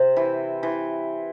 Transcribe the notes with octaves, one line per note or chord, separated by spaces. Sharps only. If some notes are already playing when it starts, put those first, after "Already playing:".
Already playing: C3 C5
E3
E3